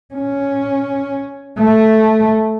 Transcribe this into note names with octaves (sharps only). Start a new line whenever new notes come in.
C#4
A3